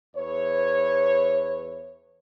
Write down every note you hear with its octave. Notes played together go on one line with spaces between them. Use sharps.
E2 B4 C#5